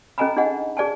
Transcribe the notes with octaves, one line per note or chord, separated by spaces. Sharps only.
C#4 A4 D#5 G#5 A#5 B5
D4 D#4 G#4 D#5 F#5
G#4 D5 G#5 A5